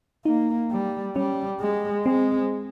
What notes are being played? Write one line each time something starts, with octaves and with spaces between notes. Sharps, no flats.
A#3 D#4
G3
G3 C#4
G#3
G#3 C4